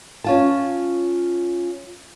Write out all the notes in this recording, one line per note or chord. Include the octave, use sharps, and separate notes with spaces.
C#4 F4 A5